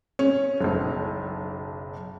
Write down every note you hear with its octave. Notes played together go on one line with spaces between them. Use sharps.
C#4
F#1 B1